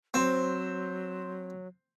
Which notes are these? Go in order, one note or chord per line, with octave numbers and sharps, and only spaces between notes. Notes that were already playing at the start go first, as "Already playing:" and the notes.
F#3 C4 C5 C6